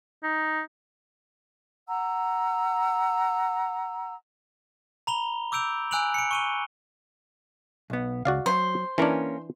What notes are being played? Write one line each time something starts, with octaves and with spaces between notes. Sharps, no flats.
D#4
F#5 A#5 E6
A#5 B5 F7 G7
D6 E6 G6 D7 F7
G#5 E6 F#6 D7 F7 F#7
C#7 D7
C#6 D#7 G7
B1 B3
C#2 F#4 D5 F5
F#3 C5
E3 A#3 C#4 D4 A#4